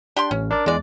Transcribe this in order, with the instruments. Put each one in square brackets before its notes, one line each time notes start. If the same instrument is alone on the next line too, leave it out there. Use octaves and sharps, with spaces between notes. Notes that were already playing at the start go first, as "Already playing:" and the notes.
[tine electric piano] D4 [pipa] G4 G5 C6
[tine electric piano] A1 [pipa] C#4
[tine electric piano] D4 A#4 D5
[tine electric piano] E2 G#3 [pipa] D4 D5